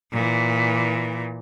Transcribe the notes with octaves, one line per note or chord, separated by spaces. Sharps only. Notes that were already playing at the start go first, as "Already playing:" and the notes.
A#2 E3